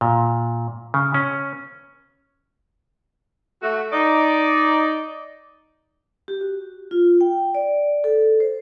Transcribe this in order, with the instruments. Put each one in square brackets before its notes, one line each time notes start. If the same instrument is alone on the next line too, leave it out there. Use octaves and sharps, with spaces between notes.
[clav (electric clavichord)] A#2
C#3
C#4
[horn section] A3 F#4
D#4 D5
[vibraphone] G4
F#4
F4
G5
D5
A4
C5